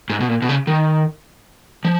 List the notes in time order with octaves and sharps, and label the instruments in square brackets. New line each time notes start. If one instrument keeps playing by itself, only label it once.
[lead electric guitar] G#2
B2
A#2
B2
C#3
D#3
F3